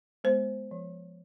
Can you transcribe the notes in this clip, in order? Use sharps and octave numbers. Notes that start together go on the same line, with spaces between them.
G#3 B3 C5
F3